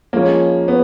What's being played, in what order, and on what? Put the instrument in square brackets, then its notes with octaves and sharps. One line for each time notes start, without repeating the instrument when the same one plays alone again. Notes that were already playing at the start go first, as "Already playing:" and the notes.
[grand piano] F3 G#3 C#4 [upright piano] A#3
[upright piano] B3